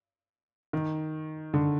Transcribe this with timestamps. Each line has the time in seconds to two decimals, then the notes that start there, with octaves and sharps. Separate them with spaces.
0.73 D#3
1.54 D3